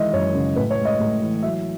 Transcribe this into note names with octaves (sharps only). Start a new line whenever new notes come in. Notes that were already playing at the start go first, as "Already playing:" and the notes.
Already playing: D#3 E3 G#3 D#5 E5
F#2 C#5
C#3
A2 B4
C#5
G#3
D#5
A2
E3
F#3 E5